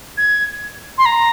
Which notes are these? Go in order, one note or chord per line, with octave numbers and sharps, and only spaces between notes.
G#6
C6
A#5